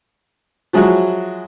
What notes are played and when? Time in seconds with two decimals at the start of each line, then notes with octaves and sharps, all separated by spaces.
0.73 F3 F#3 G#3 E4 F#4